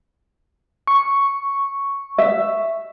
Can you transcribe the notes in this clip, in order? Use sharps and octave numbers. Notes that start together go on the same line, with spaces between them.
C#6
E5